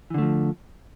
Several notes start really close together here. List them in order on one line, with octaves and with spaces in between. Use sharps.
E3 D3 A3 F3